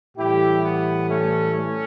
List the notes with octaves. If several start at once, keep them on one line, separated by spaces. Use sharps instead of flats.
A2 E3 G3 E4 G4
B3
A3 C#4
A3 C#4